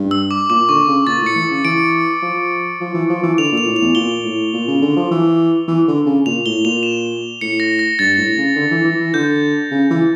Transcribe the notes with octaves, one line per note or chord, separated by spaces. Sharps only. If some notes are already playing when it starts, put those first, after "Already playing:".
Already playing: G2
E6
D6
A#2 D6
D3 C#6
C#3
A#2 A6
A2
C#7
E3
C#3
E3 D7
F3
F3
E3
F3
E3
D3 F7
A#2
F7
A2
F7
E2
A#2 G7
A2
A#2
C#3
D3
F3
E3
E3
D3
C#3
A#2 F7
A2 G7
A#2 F7
E7
A2 C#7
A#6
A#6
G2 A6
A2
C#3
D3
E3
E3
E3
D3 G6
C#3
E3